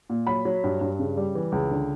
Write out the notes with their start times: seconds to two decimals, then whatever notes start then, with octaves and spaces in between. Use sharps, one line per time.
0.10 A#2
0.27 F#3 B5
0.45 F#3
0.64 G2
0.81 G2
0.99 C#3
1.17 G3
1.35 E3
1.52 C#2
1.71 D3